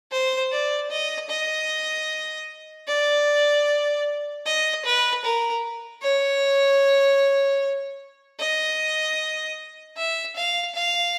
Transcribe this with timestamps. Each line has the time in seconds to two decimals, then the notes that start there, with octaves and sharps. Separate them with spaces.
0.11 C5
0.52 D5
0.90 D#5
1.30 D#5
2.88 D5
4.46 D#5
4.85 B4
5.25 A#4
6.02 C#5
8.40 D#5
9.97 E5
10.36 F5
10.75 F5